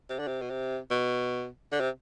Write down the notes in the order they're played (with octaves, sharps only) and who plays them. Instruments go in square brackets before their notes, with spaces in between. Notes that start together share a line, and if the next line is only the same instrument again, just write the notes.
[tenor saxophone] C3
D3
C3
B2
C3
B2
D3
C3